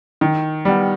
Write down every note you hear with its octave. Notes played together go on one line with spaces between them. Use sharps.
D#3
G3 B3